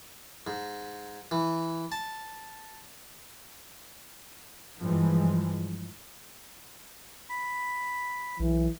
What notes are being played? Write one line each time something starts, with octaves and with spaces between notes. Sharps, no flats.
G#2
E3
A5
G2 E3 F3 G#3
B5
B1 E3